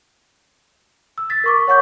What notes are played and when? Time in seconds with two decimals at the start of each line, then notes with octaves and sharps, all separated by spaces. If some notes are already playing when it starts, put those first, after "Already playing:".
1.18 E6
1.30 A6 B6
1.44 A#4 C#6 D6
1.67 C#5 F#5 C#6 G6